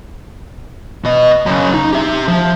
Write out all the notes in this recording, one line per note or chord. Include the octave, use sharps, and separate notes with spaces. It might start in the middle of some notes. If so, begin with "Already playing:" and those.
B2 D#5
F#2 C#3
D#4
G4 E5
F3